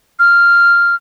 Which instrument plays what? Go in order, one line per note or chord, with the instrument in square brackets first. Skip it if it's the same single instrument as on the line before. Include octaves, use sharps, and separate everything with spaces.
[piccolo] F6